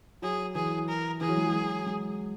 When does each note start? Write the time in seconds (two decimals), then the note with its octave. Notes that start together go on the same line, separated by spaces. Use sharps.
0.22 F#3 G#4
0.55 E3 G#4
0.88 A#4
1.21 E3 G#4
1.29 F#3
1.37 G#3
1.45 F#3
1.87 G#3